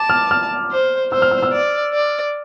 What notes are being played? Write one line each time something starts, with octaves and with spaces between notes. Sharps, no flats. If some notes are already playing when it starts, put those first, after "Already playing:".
Already playing: A5 D6
F6
F6
C5
C5 E6
F6
E6
E6
D5
D5